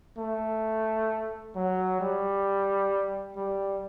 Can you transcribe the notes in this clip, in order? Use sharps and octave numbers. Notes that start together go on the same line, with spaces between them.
A3
F#3
G3
G3